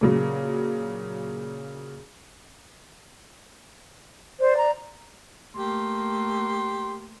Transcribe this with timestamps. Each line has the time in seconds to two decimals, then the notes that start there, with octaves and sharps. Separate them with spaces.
0.01 A#2 C#3 F#3
4.40 C5 D5
4.57 A#5
5.56 A3 A#3 G4 C6